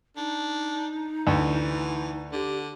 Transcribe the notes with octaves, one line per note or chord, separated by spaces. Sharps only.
D4 D#4
D2 E3
D3 G4